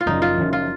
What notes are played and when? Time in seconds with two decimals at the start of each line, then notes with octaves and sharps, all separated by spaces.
0.01 F4
0.06 F#1 F#2 F3 D#4
0.22 F4
0.37 F#1 F#2 F3
0.53 F4